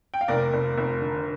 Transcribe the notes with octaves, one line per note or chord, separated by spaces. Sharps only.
G5
F5
F1 A#4 D5
F1
F1
D3